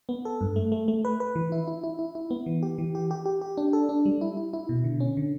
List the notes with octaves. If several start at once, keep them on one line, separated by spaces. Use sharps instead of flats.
B3
A4
G2
A3
A3
A3
B4
B4
E3
E4
E4
E4
E4
E4
B3
E3
G4
E3
G4
G4
G4
G4
D4
A4
D4
G3
E4
E4
E4
B2
D3
C#4
D3